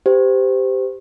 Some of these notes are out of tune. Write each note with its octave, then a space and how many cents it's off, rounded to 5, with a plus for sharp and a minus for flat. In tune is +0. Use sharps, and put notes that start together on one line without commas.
G4 +0 C5 -25